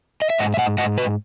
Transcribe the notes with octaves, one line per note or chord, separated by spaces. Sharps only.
D#5
E5
G#2 D#5 F#5
E5
D#5 F#5
G#2 D#5 F#5
B4 D#5